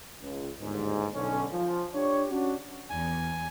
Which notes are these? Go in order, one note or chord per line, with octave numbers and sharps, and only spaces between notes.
C#2
G1 D#2 G#2
B1 B2 D3 C#4
F3
D4 G4 C#5
C#4 D4 F#4
E2 G#5